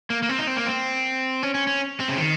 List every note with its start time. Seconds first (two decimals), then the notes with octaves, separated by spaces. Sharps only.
0.10 A#3
0.23 A#3
0.29 C4
0.39 D#4
0.47 C4
0.57 A#3
0.66 C4
1.43 C#4
1.55 C#4
1.67 C#4
2.00 C4
2.09 C#3
2.18 D#3